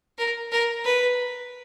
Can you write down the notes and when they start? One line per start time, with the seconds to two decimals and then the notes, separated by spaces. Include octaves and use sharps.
0.18 A#4
0.52 A#4
0.84 B4